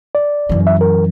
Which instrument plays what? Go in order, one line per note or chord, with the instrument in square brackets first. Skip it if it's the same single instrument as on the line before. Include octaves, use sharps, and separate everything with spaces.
[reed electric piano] D5
[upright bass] F#2 E3
[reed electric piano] E5
A#4